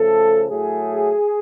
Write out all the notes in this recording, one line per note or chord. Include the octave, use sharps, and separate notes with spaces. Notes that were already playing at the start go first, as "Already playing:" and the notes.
Already playing: C#3 F3 A3 A4
A2 F#3 A3 G#4